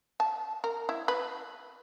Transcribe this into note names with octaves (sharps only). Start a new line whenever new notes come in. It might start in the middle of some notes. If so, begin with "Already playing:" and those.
A5
A#4
E4
B4